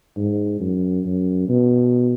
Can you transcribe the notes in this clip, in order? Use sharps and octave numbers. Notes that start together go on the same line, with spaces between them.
G#2
F#2
F#2
B2